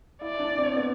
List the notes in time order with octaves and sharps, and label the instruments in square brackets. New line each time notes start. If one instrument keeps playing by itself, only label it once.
[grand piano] E4 [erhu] D5
[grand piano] D4
C4
B3